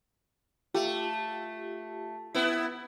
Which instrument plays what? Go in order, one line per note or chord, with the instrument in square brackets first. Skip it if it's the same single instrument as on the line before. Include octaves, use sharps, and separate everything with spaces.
[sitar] A3 [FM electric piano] F4 G4
[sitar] B3 E4